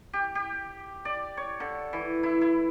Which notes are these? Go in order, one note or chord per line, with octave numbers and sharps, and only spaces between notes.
G4
G4
D5
C#5
D3
E3
E4
E4